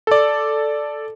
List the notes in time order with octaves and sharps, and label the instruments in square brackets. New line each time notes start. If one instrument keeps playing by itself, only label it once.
[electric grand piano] A4 D5